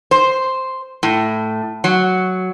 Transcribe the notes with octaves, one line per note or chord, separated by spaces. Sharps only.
C5
A2
F#3